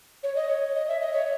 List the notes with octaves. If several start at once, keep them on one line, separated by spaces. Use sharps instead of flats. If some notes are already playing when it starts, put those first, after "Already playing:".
C#5
D#5
C#5
D#5
E5
D#5
C#5